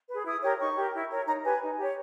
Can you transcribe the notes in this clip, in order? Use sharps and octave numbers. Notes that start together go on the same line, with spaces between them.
G#4 B4
E4 D#6
G4 A#4 C#5
D#4 C#6
G4 A#4
E4
A#4 C#5
D#4 A#5
G4 B4 G#5
D#4
G4 C#5